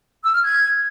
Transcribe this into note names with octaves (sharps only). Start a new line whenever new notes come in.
E6
F6
G#6